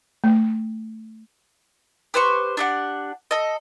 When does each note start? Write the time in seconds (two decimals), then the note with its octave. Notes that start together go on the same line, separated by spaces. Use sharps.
0.24 A3
2.14 G4 B4 C5 C#6
2.57 D4 G4 F#5
3.31 A4 D#5